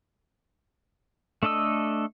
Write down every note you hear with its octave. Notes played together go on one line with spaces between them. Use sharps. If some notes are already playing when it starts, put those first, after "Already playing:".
A3 D4 A4 D#5 E6